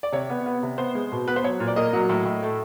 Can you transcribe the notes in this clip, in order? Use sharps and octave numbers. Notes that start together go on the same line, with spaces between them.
D5
C3 C#5
B3
B3
C3
B3 C5
G#3
B2
B3 B4
C5
F#3 C#5
A#2
D5
A#3 D#5
F#3
A2
A2
A3